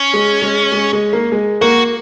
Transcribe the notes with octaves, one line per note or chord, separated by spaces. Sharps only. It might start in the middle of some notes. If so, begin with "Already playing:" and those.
Already playing: C#4
G#3
G#3
G#3
G#3
A#3
G#3
A#3 F#4